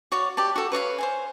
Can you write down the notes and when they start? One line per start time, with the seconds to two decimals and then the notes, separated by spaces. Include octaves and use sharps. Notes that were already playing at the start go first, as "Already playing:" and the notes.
0.12 F#4 C#5 D5 F5
0.37 G4 D5 A5
0.56 F#4 A4
0.72 B4 C#5 D5 F5
0.98 C5 F5 G#5